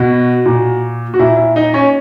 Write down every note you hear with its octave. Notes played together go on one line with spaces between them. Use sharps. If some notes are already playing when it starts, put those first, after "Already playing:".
Already playing: B2 F#4
A#2
F#4
A#2 E4
E4
D#4
C#4